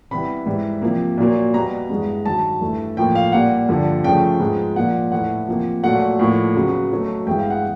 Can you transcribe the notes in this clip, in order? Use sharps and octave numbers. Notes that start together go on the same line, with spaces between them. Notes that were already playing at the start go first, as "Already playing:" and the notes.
C3 E3 G3 B3 B5
G#2 E3 G3
C3 F3 A#3
A#2 F#3 A#3
B2 G3 B3 A#5
G2 E3 G#3 B3
G2 D#3 F#3 A5
G2 E3 A3
A2 F3 A#3 G5
F5
A#2 G3 A#3 F#5
G2 D3 F3
C#3 F3 A3 G5
G#2 F3 G#3 B3
A#2 F3 A#3 F#5
A2 E3 A3 F#5
C3 F3 A#3
A#2 F#3 A3 F#5
A2 F3 A#3
C#3 F#3 B3
B2 F#3 A3
G2 E3 G#3 B3 G5
F5
F#5